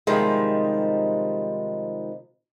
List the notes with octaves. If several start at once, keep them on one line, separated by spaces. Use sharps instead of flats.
C3 D#3 F3 G3 G#3